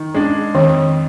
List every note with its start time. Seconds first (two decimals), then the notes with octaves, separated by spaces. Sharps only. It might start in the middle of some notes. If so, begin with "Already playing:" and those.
Already playing: D#3
0.14 G#3 D4
0.54 F2 D#3